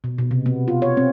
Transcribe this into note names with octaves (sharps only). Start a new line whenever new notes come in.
B2
B2
C3
B3
F4
C#5
C4